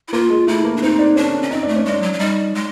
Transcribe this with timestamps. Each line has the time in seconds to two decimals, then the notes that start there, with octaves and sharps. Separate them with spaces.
0.08 E4
0.13 A#3 F4
0.30 G#3
0.47 A3 E4
0.65 A#3
0.77 D4
0.82 C4 D#4
0.99 D4
1.16 C#4 D4
1.43 C#4
1.51 C4 D#4
1.63 D4
1.68 A3
1.76 C#4
1.85 G#3 D4
2.02 F#3
2.13 F#3
2.19 G3 D#4
2.55 G#3